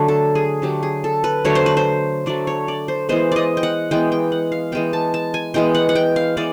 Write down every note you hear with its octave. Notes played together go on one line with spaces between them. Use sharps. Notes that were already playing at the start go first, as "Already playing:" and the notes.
Already playing: D3 F#3 A3
A4
G#4
D3 F#3 A3 G4
G#4
A4
B4
D3 F#3 A3 C#5
C5
B4
C5
D3 F#3 A3 D5
C#5
D5
C5
E3 G#3 B3 C5
D5 D#5
G5
F#5
E3 G#3 B3 G5
G5
F#5
F5
E3 G#3 B3 G5
A5
A5
G#5
E3 G#3 B3 G5
F#5
F#5
G5
F5
E3 G#3 B3 D5